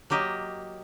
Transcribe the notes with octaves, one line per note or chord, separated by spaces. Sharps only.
F#3 A#3 G4 D#5